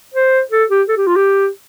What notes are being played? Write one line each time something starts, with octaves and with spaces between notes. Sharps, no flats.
C5
A4
G4
A4
G4
F4
G4